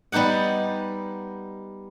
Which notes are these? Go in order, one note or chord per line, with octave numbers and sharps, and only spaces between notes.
G3 B3 D#4 G4 F#5